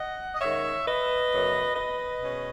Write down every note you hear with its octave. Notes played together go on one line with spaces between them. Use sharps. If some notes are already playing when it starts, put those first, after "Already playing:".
Already playing: D#5 F#5
D#5
D#3 G#3 C#4 C#5 E5
B4 D#5
F#2 C#3 F#3 B3
B4 D#5
B2 G#3 C#4